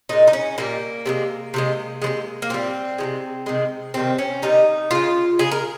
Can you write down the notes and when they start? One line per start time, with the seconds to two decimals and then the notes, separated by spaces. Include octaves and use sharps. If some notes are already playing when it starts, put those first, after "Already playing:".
0.09 A#2 G#3 D#4
0.27 D#4
0.33 C#4
0.58 A#2 G3 A#3
1.06 C3 F3 G#3
1.54 C3 F3 G#3
2.02 C3 F3 G#3
2.42 A#3
2.50 A#2 G3 C4
2.98 F3 G#3
3.03 C3
3.46 C3 D#3 G#3
3.94 C3 D#3 G3 C4
4.19 C#4
4.42 C3 D#3 G3 D#4
4.91 C#3 G#3 F4
5.39 C#3 G#3 G#4
5.51 A#4